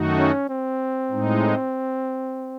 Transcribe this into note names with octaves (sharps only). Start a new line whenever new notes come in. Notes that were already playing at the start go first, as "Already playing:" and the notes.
Already playing: F#2 D#3 A3 D#4 F#4
C#4
C4
A2 G#3 D#4